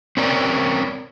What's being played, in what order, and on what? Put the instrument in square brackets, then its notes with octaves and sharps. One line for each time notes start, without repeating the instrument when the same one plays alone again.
[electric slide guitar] C4 C#4 A#4 D5